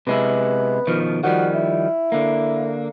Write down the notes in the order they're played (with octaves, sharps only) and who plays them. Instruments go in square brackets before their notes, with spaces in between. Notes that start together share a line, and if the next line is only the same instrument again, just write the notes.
[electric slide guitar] C3 G#3 E4 [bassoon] B3
[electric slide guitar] B2 D#3 F3
[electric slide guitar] D#3 F3 G3 [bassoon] F#4
[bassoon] E4
[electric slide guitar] D3 A#3